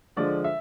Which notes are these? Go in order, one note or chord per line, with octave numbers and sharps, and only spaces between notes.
D3 F3 G#3 D5
E5